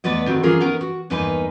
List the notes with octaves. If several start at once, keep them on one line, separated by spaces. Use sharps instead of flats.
E2 A3 B3 B4 D5 D#5
D3 D#3 C4 F#4
E3 G3 C#4 F4 G#4 A#4
B3 C#4 D#4 G#4 A#4 B4
F#4
E2 G2 A#3 D#4 B4 G#5